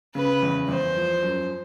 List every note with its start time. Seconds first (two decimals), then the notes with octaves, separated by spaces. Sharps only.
0.15 C#3 B4
0.42 E2
0.68 E2 C5
0.95 F3
1.23 F#2